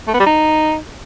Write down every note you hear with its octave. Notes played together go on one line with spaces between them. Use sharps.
A3
B3
G3
D#4